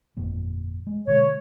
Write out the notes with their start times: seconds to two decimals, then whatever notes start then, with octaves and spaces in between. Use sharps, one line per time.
0.17 G1 F2 A#2
0.87 G#3
1.07 B2 D3 G#3 C#5